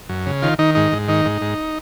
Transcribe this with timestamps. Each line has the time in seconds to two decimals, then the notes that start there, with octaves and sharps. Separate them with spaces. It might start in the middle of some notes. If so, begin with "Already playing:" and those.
0.09 F#2
0.26 C#3
0.42 D#3 F4
0.59 D#3 D#4
0.75 G#2 D#4
0.92 G#2
1.08 D#3 D#4
1.25 G#2
1.42 G#2